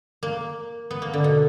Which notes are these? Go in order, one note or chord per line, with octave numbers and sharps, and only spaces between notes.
A#3
B3
A#3
D3
B2